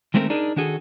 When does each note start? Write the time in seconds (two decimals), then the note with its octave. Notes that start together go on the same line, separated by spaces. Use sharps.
0.14 D#3 G#3 A3 C4 G#4 A#4
0.30 D4 D#4 G#4 A#4
0.56 D#3 D4 F#4 G#4 A4